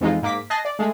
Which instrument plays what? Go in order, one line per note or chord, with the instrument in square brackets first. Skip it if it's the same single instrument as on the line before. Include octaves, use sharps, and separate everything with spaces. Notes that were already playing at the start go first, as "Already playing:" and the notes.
[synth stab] F2 E3 G#3 D#4 F4
G#2 A#3 D6 B6
D#5 G#5 A5 F#6 A#6 C7
D5
G#3 A3 G#4